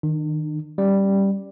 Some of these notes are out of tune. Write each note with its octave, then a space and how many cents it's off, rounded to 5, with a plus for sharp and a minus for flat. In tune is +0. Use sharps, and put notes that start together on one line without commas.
D#3 +0 D4 +45
G3 +0 C#4 +0